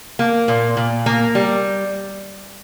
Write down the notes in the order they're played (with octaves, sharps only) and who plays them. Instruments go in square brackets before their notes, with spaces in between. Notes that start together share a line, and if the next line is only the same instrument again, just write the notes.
[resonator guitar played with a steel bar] A#3
A#2
A#2
A#3
G3